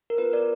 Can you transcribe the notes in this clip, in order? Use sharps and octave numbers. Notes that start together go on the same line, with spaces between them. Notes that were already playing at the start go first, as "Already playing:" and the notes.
A#4
B3 F4 G#4 B4
A#4 D5